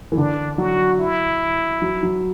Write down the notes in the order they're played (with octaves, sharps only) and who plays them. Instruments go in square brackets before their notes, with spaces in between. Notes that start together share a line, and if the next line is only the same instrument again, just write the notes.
[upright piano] E3
[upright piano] D3 [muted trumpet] D4
[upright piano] F#3 [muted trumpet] F#4
[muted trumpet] E4
[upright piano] F#3
F#3